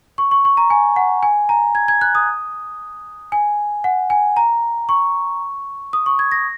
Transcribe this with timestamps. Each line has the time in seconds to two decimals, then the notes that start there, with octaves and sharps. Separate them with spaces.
0.18 C#6
0.31 C#6
0.45 C#6
0.57 A#5
0.70 G#5
0.96 F#5
1.23 G#5
1.49 A#5
1.75 G#6
1.88 G#6
2.01 F#6
2.15 D#6
3.32 G#5
3.84 F#5
4.10 G#5
4.37 A#5
4.89 C#6
5.93 D#6
6.06 C#6
6.19 G#6
6.32 A#6